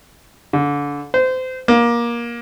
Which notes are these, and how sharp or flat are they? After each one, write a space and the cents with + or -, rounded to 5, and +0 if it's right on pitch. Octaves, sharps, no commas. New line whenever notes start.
D3 -25
C5 -25
A#3 +20